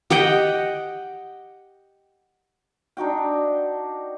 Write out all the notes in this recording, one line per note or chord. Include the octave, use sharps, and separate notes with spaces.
G4 D#5 F#5 G5
D4 D#4 F#4 G5